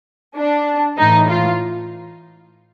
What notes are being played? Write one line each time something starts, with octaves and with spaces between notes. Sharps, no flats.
D4
A2 E3 D#4
F4